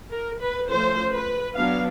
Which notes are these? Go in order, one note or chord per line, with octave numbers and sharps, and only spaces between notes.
A#4
B4
F3 A3 C#4 C5
B4
F#3 B3 D4 F5